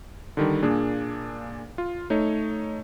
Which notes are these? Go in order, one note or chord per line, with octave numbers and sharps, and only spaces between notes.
D3 D#3 G3
A#2 A#3 D4 G#4
F4
A3 D#4 C#5